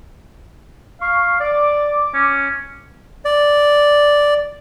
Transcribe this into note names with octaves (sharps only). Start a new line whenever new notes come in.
F5 C#6
D5 D6
C#4
D5